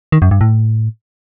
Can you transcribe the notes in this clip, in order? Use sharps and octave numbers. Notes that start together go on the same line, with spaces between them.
D#3
F#2
G2
A2